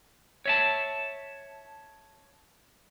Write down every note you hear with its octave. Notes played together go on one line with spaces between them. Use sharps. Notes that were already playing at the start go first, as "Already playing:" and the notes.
C#5 E5 A5